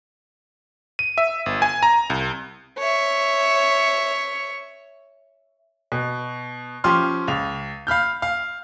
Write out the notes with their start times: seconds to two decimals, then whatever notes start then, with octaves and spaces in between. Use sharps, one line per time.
0.99 D#7
1.18 E5
1.46 G1
1.62 G#5
1.83 A#5
2.10 C2
2.78 C#5 E5
5.92 B2
6.84 F3 C#4 G4 C6 D6 F6
7.28 C#2 F7
7.87 F5 B5 F6 G6
8.22 F5